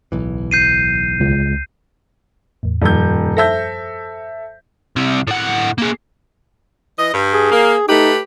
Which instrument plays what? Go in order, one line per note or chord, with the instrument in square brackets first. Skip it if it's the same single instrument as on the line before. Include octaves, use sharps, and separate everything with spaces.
[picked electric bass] D1 B1 E3
[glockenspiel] G6 C7 D#7
[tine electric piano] C#2
[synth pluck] E2 A2
[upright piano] D#1 G6 [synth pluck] F#2 F3
[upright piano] A4 E5 G6 [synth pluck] C5 A#6
[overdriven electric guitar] C2 C3
A2 F#5
A#3 G#4
[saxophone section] E3 D#5
G2
[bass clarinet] G#4
[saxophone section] A#3
[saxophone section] A3 G4 B4 [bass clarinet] D#4